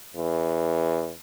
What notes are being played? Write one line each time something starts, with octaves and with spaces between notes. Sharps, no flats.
E2